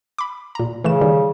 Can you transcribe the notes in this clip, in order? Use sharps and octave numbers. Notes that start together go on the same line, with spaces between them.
B5 D6
A#2 A#5
C#3 E3 A3 E7
D#3 G3